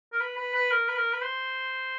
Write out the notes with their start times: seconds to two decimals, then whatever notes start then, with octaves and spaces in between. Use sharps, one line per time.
0.13 A#4
0.20 B4
0.37 B4
0.54 B4
0.71 A#4
0.88 B4
0.96 A#4
1.13 B4
1.21 C5